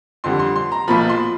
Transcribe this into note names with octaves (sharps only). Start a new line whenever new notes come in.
F2 D3 G3 C6
C6
C6
A#5
B1 A#2 F3 B5
C6